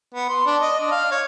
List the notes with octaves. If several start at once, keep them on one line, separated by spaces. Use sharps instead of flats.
B3
C6
D4
D#5
D4
F5
C#5